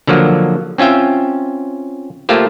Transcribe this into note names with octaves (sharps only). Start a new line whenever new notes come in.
D3 F3 F#3 A#3
C4 C#4 F4 E5 G5
A3 A#3 F4 G4 C5